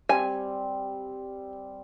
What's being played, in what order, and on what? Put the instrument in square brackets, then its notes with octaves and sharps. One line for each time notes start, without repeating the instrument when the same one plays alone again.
[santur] G3 C4 [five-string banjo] G#5